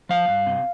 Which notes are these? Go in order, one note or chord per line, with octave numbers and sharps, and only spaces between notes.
F3 F5
G2
C3